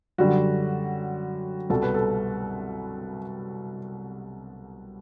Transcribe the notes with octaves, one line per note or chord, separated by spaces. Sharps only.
F#2 D3 G3 F#4
C2 B2 G3 A4
B4
A4